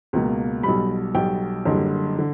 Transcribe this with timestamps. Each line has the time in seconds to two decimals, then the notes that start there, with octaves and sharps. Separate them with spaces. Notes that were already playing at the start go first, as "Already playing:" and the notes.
0.13 C#2 B2 A#3
0.63 B1 B2 G3 B5
1.14 B1 B2 G3 G5
1.65 F#1 F#2 D3 G3
2.19 D3